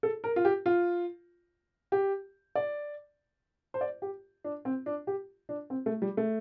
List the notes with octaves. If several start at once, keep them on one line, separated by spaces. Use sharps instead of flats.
A4
A#4
F4
G4
F4
G4
D5
C5
D5
G4
D4
C4
D4
G4
D4
C4
A3
G3
A3